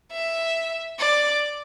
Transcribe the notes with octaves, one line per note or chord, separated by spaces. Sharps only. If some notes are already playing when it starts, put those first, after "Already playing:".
E5
D5